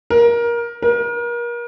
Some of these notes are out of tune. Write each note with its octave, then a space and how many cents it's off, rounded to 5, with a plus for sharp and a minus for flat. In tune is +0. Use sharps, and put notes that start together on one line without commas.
A#4 +20
A#4 +35